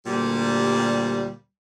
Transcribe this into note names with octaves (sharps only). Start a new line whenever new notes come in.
D2 A#2 G3